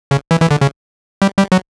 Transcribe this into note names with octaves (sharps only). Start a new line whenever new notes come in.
C#3
E3
E3
D3
C#3
G3
G3
F#3